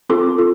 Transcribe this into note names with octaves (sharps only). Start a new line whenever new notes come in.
C4 F4 A4 C6 D6
F4 A4